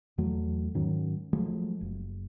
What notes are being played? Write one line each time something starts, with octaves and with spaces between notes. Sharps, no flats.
E2 F#3 A3
G#2 D#3 F#3 C#4
F3 F#3 G#3 A3
F#1